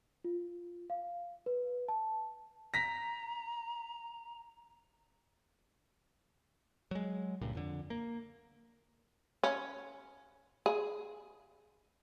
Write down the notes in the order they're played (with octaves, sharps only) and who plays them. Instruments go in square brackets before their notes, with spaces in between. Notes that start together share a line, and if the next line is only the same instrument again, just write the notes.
[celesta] F4
F5
B4
A5
[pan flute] A#5 [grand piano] A#6 B6
[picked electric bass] F#3 G#3
C#2 G2 A#2
F2 D3
A#3
[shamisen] C#4
G#4